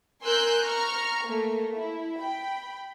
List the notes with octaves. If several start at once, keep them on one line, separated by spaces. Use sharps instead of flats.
A#4 G#5 C6 E6 F#6 G6
A#5 C#6 F6
A3 A#3
E4
G5 B5